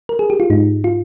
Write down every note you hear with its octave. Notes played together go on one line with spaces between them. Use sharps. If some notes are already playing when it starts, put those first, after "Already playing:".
A#4
G#4
G4
F4
G#2 D#4
F4